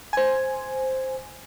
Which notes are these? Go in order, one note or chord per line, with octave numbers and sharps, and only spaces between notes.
C5 G#5